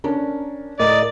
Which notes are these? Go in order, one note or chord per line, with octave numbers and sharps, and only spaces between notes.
C#4 D4 A#4
A2 A#4 D5 D#5